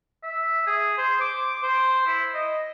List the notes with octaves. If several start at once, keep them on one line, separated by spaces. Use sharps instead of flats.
E5
G#4
C5
D6
C5
E4
D#5